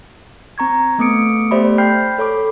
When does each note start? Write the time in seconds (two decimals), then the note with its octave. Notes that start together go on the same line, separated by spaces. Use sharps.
0.58 C4 A#5 C#6 G#6
0.98 A3 B3 D6 D#6 C#7 D7
1.51 A3 G4 C5 D5 E5 B5
1.78 G5 B5 F6 G6 C7
2.18 A4 C#5 B5 D6